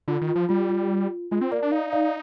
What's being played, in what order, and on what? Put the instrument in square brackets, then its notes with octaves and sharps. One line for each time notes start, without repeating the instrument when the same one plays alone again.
[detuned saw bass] D3 [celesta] F4
[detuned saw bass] D#3
[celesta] F4
[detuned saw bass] F3
[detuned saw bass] G3 [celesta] F4
[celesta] F4
[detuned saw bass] G#3 [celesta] F4
[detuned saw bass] C4
[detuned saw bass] A#3 [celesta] A#4 D5
[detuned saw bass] D4
[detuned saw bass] D#4 [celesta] D5 F5
[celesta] D5 F5